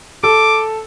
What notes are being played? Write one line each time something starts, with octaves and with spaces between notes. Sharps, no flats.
A4 D6